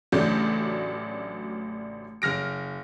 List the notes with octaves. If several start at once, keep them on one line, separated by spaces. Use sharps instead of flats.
A1 C#3 F#3 A3 D4 G6
F#1 F6 A#6 D7